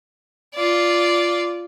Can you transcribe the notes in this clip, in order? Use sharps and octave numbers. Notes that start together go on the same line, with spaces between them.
F4 D5